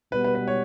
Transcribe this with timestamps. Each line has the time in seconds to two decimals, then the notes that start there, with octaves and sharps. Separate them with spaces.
0.12 B2 G3 B3 B4
0.24 B4
0.35 B4
0.48 C#5